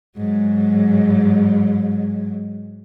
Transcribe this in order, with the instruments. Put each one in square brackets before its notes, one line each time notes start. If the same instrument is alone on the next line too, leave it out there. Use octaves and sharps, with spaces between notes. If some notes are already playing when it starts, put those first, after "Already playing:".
[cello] G#2 F#3